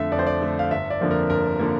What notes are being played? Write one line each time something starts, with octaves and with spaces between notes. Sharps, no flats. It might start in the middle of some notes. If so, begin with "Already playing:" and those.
Already playing: F2 D3 A3 E5
F2 D5
C5
D5
D3 A3
F5
G1 E5
D5
F2 D3 F3 A#3
A#4
G1 A#4
D3 F3 A#3